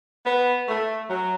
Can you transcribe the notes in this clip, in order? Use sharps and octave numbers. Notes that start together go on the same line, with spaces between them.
B3
A3
F#3